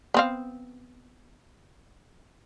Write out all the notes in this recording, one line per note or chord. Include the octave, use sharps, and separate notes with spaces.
B3 C4 F5